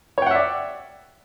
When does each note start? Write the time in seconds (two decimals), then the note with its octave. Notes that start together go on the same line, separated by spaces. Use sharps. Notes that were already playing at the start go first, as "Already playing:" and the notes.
0.18 C#5
0.22 G5
0.26 F#5
0.31 E5
0.35 D5